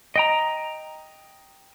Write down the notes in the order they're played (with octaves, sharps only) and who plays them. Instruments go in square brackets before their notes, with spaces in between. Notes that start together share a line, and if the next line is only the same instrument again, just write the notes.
[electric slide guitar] D#5 G5 A#5